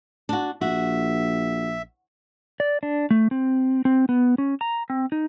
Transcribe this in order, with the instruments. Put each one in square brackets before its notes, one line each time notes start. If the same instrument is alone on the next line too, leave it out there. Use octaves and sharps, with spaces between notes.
[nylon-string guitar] D4 F#4
[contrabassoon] A#1 [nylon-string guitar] F#4 [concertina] E5
[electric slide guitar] D5
D4
A3
C4
C4
B3
C#4
A#5
C4
D#4